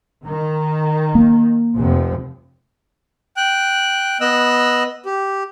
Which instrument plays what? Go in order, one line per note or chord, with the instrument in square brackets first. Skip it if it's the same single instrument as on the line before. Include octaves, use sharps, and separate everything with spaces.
[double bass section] D#3
[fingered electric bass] A#3
[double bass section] F1 F3
[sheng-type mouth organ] G5 F#6
B3 D#5 E6 F#6
G4